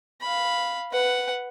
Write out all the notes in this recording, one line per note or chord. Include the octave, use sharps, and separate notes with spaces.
F5 B5
B4 F#5